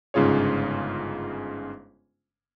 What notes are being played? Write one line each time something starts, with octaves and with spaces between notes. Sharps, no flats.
G1 G#2 C#3 F4 G#4 C#5